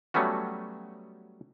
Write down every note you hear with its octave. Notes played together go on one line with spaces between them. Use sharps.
F#3 G3 A3 B3 C#4 F#4